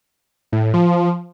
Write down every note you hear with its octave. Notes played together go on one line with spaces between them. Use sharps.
A2
A2
F3